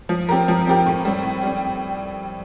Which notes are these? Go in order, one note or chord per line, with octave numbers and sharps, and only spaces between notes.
F3
C4 G4 A#4
F3
C4 G4 A#4
A2
G3 C4
A2
G3 C4